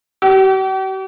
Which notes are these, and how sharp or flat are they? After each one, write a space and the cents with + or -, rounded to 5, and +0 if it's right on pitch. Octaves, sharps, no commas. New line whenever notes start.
G4 -45